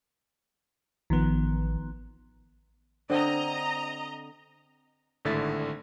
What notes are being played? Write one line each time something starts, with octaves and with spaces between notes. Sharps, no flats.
A1 D#3 F3 B3
D3 C4 D#5 A#5
G#1 A2 D3 E4 A6 B6